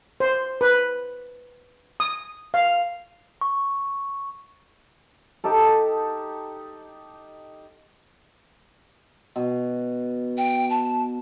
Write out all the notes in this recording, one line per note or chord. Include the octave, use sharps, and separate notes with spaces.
C5
B4
D#6
F5
C#6
D#4 G4 A4
B2
G5
A5